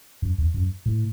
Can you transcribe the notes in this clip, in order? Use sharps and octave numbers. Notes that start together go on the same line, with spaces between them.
F#2
E2
F#2
A2